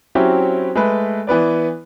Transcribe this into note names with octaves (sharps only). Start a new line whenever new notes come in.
F#3 C4 C#4 E4 F#4 G4
G#3 A3 B4
E3 B3 B4 D5